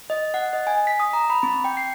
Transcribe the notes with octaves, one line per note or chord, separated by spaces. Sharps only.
D#5
F#5
D#5
G#5
B6
D#6
A#5
B5
C4
G5
C7